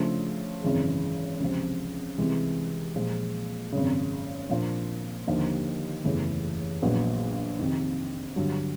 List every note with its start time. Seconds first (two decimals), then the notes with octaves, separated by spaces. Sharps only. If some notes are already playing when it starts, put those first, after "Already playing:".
Already playing: C#3 F3 A3 D4 F4
0.63 G#1 F#2 C#3 E3 G#3
1.40 C#2 C3 F3
2.18 C2 C3 E3 G#3
2.95 A#2 F3 G#3
3.72 G#1 F#2 C#3
4.49 A#2 F3 A#3 D4 F4
5.27 D#2 D3 F3 A#3 D#4
6.04 F#1 E2 C#3 E3 A3
6.82 A#1 A#2 F#3 B3
7.59 F2 C3 D#3
8.36 G2 D3 F#3